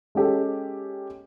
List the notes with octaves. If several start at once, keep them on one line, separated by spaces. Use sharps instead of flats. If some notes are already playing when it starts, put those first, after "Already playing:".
G#3 C#4 G4 A4